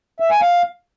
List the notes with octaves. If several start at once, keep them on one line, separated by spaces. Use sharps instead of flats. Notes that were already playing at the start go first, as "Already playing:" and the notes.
E5
G#5
F5